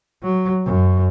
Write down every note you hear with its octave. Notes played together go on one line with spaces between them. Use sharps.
F#3
F#2